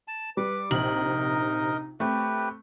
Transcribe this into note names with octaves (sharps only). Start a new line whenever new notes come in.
A5
G3 B4 D6
A#1 C3 D#4 A#4 D#5 F#7
A3 C4 G4 B4